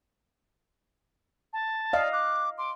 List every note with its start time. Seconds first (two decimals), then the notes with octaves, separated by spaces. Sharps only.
1.53 A5
1.93 D5 D#5 F5
2.13 D6 F#6
2.58 C6 D6